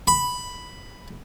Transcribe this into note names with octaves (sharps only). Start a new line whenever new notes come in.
B5